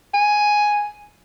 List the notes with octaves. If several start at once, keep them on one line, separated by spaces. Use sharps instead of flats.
G#5